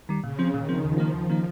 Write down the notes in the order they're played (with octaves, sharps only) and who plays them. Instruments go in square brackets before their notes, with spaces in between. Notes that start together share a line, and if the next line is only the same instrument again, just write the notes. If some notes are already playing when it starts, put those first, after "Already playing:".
[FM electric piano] D#3 G3
[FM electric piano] A#2 [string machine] C#3
[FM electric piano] F3 C4
[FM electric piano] A#2 [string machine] D#3
[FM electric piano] F3 C4
[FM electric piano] D#2 [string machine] F3
[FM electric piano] D#3 A#3 D#4
D#2
D#3 A#3 D#4